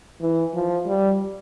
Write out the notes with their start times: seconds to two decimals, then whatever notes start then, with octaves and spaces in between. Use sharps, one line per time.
0.21 E3
0.55 F3
0.87 G3